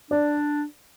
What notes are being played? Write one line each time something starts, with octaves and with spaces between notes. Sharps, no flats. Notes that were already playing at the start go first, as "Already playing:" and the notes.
D4 D5